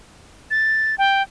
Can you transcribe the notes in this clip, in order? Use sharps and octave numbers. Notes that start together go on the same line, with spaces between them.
A6
G5